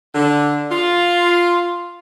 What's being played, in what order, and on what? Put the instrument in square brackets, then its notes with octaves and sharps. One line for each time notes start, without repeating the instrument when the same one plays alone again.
[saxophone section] D3
F4